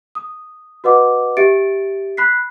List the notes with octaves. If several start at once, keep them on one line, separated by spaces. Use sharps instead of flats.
D#6
F#4 B4 D#5 F#5 D6
G4 E5 A6 C#7 D7
B5 F#6 B6 C7